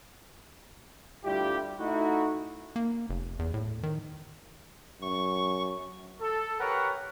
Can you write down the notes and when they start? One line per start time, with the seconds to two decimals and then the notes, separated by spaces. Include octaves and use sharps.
1.24 D2 G3 D4 E4 F4 G4
1.78 A3 D#4 E4 F#4
2.76 A#3
3.09 F1
3.39 E2
3.54 A2
3.83 D#3
5.02 F#2 C#6
6.21 A4
6.60 G4 A#4 B4 C#5 F#5